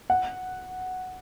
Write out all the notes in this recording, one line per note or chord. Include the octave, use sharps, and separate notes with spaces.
F#5